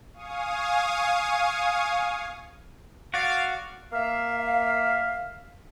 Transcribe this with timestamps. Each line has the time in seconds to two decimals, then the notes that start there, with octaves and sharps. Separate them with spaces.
0.13 F5 G#5 C#6 D#6
3.14 F#4 D5 F5
3.93 A#3 E5 F5